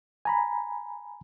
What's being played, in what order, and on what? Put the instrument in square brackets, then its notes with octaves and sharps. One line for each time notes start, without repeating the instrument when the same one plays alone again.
[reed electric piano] G#5 A#5 B5